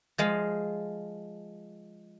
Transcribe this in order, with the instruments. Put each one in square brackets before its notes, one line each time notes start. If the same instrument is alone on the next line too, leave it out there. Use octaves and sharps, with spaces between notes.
[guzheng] F3 G#3 F5